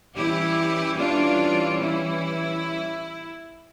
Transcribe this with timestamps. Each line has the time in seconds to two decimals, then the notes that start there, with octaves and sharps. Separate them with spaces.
0.16 E3 G3 C#4 E4 G4
0.99 D4 F4
1.81 E4